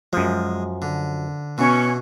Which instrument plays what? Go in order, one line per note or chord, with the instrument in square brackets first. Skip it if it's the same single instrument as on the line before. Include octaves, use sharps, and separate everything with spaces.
[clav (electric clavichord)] F#2 F3 [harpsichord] G#3
[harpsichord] D3
[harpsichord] B2 E3 [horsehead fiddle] B3 [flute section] C#4 C#6